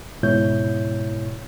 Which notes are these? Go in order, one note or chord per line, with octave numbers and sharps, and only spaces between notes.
C#2 G#2 B2 E4 C#5 G6